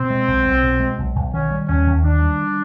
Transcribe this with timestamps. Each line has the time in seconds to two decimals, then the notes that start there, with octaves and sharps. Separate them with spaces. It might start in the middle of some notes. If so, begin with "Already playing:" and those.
Already playing: B2 C4
0.10 G#3
0.28 B1
0.44 B1
0.63 B2
0.80 G#3
0.99 B1
1.16 B1
1.34 D#3 C#4
1.51 G3
1.68 D#2 C#4
1.86 D#2
2.04 D#3 D4
2.22 G3